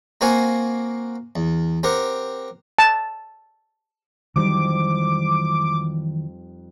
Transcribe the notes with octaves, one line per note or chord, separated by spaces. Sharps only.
A#3 C4 F#4 F5 F#5 G#5
E2
C4 G4 A#4 F#5
A5
F2 D#3 E3 F#3 G3 D#4 D6